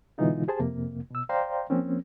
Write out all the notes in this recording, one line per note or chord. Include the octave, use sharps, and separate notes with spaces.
B2 D3 E3 G#3 D#4 F4
G4 G#4 C5 A5
F2 C3 A#3
B2 E6
C5 D5 F5 G5 A#5 C6
F3 A#3 C4 C#4